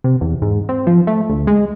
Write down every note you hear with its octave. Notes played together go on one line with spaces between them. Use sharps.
C3
E2
G#2
C4
F3
A3
D2
G#3